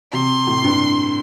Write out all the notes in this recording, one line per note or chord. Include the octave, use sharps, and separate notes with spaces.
C3 C6
A2
G2